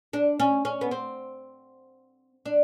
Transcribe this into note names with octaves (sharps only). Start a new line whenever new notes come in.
D4
C#4
C#4
B3
C4
D4